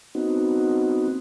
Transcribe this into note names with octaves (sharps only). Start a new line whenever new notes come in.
B3 C4 D#4 F#4